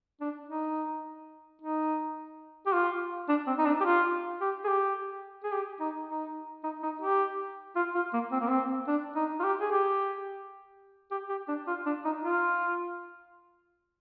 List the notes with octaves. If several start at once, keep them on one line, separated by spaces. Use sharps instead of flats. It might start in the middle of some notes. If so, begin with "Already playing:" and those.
D4
D#4
D#4
G4
F4
D4
C4
D#4
D4
G4
F4
G4
G#4
G4
G#4
G4
D#4
D#4
D#4
D#4
G4
F4
F4
A#3
C4
A#3
C4
D4
D#4
F4
G4
G#4
G4
G4
G4
D4
F4
D4
D#4
F4